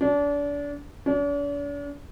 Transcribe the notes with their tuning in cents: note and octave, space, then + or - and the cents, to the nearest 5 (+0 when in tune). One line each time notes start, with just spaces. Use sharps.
D4 -30
D4 -45